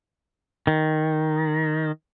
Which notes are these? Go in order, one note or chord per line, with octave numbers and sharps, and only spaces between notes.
D#3